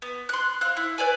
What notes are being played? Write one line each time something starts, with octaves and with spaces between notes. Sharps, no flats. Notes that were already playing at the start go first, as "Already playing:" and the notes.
B3
C6 F#6
C4 F5 F#6
E4
B4 C#5 D5 G#5